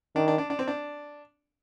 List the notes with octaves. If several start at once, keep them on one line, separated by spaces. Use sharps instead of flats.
D#3 D4
D4
D4
D4
C4
D4